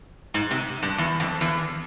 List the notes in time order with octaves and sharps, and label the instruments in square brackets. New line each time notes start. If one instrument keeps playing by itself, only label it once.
[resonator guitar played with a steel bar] G#2
C3
G2
E2
F2
E2